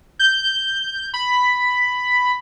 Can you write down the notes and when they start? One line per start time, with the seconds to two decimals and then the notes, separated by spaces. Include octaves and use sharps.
0.19 G6
1.14 B5